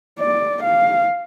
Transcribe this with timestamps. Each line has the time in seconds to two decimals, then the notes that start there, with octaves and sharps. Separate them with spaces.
0.19 D5
0.64 F5